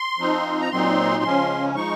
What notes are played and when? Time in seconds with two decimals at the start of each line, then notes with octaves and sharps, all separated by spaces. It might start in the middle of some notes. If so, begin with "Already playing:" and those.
Already playing: C6
0.19 F3 C4 D#4
0.61 A#5
0.71 A#2 F#3 C4 D#4 C6
1.24 C#3 F3 G#3 C#4
1.75 F3 G#3 D#4 C#6